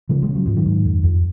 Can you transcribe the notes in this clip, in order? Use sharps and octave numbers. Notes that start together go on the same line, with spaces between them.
C#3 F3 G#3
F3 G#3
C#3
F#3
G#2 F3
D#3 F#3
G#2
F2
F2